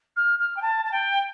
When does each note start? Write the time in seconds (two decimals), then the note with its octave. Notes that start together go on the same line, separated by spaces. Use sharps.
0.16 F6
0.39 F6
0.56 G5
0.62 A5
0.85 A5
0.92 G5